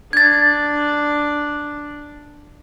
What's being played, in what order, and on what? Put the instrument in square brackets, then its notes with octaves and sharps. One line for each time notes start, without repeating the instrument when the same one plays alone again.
[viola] D4 [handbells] G#6 A6